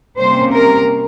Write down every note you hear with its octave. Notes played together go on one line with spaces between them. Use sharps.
C3 G3 A#3 C#4 C5
A#4